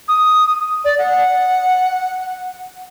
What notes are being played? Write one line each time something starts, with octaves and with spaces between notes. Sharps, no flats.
D#6
D5
F#5